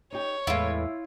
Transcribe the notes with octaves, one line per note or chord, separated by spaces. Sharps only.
D#4 G4 C#5
E2 A2 G#3 E4 F4 B4